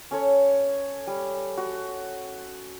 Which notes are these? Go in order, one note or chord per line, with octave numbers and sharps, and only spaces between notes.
C#4 A4 C#5
G3
F#4